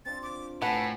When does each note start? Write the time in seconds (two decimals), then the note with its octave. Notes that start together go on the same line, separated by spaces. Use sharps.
0.05 C4 D4 F4 A6
0.23 D6
0.62 A2 A4 B4 C#5 F#5 G#5 A#5